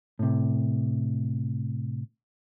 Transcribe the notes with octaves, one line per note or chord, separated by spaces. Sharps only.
A2 C3